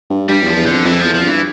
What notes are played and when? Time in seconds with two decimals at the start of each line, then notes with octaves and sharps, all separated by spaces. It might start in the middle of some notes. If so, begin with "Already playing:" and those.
0.10 G2
0.29 G2 G3
0.42 E2 F3
0.57 E2
0.66 D3
0.72 F2
0.85 F2 E3
1.00 E2 F3
1.14 F3
1.23 G2 E3